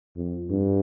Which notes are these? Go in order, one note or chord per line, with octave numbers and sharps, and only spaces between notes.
F2
G2